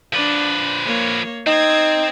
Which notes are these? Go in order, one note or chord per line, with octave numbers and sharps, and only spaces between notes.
F3 D4 B4 D5
A#3 C#5
C4 D#4 D#6 G#6